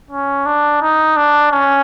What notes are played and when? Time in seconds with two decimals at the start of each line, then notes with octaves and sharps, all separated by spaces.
0.11 C#4
0.46 D4
0.82 D#4
1.17 D4
1.52 C#4